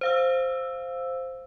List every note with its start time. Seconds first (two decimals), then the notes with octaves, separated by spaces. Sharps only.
0.01 C5 F5 E6